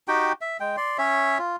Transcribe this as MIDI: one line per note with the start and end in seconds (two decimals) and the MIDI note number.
0.08 0.33 63
0.08 0.33 66
0.08 0.33 67
0.08 0.33 79
0.41 0.57 76
0.60 0.76 56
0.60 0.76 79
0.77 0.97 74
0.77 0.97 84
0.98 1.38 61
0.98 1.38 73
0.98 1.38 76
1.39 1.56 65